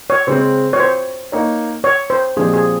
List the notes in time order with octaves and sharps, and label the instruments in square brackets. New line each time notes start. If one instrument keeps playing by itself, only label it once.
[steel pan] C#5
[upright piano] C#3 G#3 C4 [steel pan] C5
[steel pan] C#5
C5
[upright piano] A#3 D#4 A#4 C#5
[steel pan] C#5
C5
[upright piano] A#2 F3 G#3 C4 G4 [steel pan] G#4
[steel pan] G#4